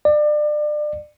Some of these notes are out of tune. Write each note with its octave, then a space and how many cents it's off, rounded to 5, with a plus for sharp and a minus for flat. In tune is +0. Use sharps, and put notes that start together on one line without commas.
D5 +30